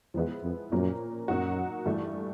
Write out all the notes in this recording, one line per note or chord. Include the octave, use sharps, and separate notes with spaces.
E2 F3 G#3 B3 E4
F2
F#2 A#2 F3 A#3 C#4
F#2 F#3 A#3 D#4 F#4
G2 E3 A3